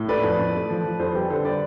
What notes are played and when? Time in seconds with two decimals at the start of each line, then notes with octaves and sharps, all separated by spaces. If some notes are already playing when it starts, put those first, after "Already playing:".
Already playing: A2
0.08 A3 B4 D5
0.24 F2
0.39 F2
0.54 A3
0.70 F3
0.84 F3
1.00 F2 A4 C5
1.15 G3 G4 B4
1.30 D3 A4 C5
1.45 B4 D5